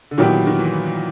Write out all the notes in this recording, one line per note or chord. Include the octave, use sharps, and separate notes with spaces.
D3
A#2 D#3 F#3 B3 E4 G4
D#3
E3